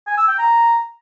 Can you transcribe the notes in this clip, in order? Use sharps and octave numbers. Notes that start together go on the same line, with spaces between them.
G#5
E6
G5
A#5